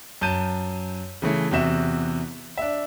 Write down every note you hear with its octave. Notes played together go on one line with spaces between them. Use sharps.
F#2 A5 G6 D#7
C#3 E3 A3
E2 C3 F#4 E5 E7
D4 E5